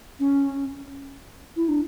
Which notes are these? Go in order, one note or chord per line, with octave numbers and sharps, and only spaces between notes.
C#4
E4
D4